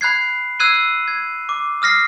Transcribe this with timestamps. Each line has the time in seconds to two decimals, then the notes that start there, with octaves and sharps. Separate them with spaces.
0.01 B5 F#6 G#6 C7
0.59 E6 F#6 G#6 C7 D#7 F#7
1.08 G#6
1.49 D6
1.82 D#6 F6 A#6 C7